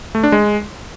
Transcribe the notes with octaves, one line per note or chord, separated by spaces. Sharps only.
A3
D4
G#3